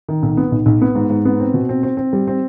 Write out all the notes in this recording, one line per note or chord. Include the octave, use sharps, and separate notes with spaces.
D#3
B1
B3
B1
B1
B3
G#2
G#2
B3
C4
B2
C4
C4
C4
G3
C4